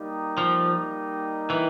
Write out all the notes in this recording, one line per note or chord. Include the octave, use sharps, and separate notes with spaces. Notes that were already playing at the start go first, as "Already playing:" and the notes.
Already playing: G3 A#3 D#4 G4
F3
E3